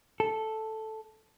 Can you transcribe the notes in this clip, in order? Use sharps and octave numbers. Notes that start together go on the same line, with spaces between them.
A4